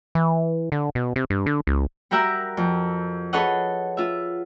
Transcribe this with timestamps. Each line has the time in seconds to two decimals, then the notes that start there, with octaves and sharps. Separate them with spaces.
0.15 E3
0.72 D3
0.95 B2
1.16 C3
1.30 G2
1.46 D3
1.67 C#2
2.11 G3 F#4 G4 A#4 E5 F#5
2.57 F2
3.33 G#4 A4 B4 C#5 D#5 F#5
3.97 F4 E5